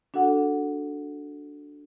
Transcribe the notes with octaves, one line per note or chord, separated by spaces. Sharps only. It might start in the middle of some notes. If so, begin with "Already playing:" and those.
D4 F#4 A4 F#5